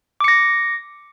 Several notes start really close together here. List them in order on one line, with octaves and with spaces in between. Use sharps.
D6 C#7 A#6